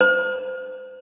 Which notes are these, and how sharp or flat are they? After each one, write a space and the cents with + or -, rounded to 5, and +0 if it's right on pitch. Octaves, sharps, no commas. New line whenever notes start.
C5 -30